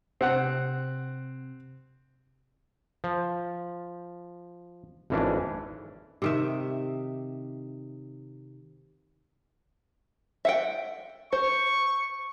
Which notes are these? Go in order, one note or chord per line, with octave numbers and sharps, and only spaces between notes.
C3 C4 F#5 F#6
F3
G#1 F2 E3 C#4 D4
C3 D#3 E5
E5 F#5 G5
C5 C#6